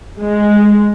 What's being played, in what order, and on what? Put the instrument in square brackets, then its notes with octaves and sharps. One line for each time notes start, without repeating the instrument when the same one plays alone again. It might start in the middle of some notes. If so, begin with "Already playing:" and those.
[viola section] G#3